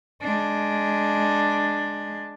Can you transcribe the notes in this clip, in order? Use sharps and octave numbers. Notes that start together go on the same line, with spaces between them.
G#3 D4